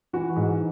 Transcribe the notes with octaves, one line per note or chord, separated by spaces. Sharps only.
E3 F#4
G#2